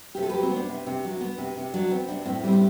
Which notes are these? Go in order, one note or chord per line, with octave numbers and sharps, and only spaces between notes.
C3 G4
A4
F#3 G4 B4
C4
B3
D4
C3
C3
F#3
B3
C3
C3
F#3 D4
B3 C4
C3 D4
A2 C4
G3 C4
D4